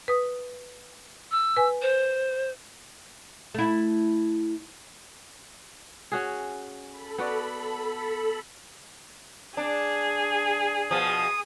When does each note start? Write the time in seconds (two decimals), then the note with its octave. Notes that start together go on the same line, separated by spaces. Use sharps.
0.08 B4 D#6
1.32 E6
1.56 B4 G#5
1.82 C5
3.54 A3 E4
6.12 C#4 F#4 G#4
6.88 A4 B5
7.18 B3 F#4 D5
9.57 D4 G#4
10.91 B2 F3 D#6